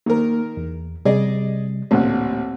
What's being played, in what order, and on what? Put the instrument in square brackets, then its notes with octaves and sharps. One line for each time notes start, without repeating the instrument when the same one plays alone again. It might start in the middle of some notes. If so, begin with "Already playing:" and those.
[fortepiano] D#3 A#4 [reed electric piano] A#3
[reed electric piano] E2
[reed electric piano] C3 G3 [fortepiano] G#4 D5 D#5
[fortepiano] A1 D2 A#2 [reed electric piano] C4 F#5